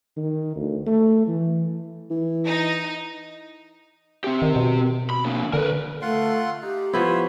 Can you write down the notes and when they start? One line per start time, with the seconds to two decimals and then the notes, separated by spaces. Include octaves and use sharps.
0.17 D#3
0.56 D2
0.86 A3
1.28 E3
2.10 E3
2.45 D#4
4.24 C4 G4
4.42 D#3
4.56 B2
5.10 B5
5.25 D3 A#3
5.53 D3 A#4 B4
6.02 A3 F4 F#5 C6
6.62 D#4 G4
6.93 F3 B3 E4 C5 C#5